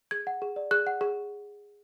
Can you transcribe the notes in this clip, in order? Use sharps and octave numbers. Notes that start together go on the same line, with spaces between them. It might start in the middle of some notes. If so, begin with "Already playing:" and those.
G#4 G#6
F#5
G#4
D5
G#4 F#6
F#5
G#4